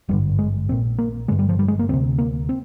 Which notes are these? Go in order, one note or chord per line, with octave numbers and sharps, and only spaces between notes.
G#1 G2 D3 G3
G#3
A#1 A#2 C4
A#3
G1 G2 D3 G#3
G3
F3
G3
G#3
A#3
D2 C3 C4
A#3
C4